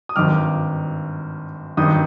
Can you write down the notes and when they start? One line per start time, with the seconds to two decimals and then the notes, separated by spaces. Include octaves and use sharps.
0.09 D#6
0.16 G#1 G2 D#3 D6 F6
1.77 G#1 G2 D#3 D#6 G6